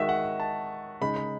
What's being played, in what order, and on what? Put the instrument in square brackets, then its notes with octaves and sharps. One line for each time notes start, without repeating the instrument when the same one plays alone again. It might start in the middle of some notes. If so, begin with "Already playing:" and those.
Already playing: [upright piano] D#3 G#3 D#4 F#4 [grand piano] D#5 E5
[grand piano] F#5
A5
[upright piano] C#3 G#3 D#4 [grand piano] B5
[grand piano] B5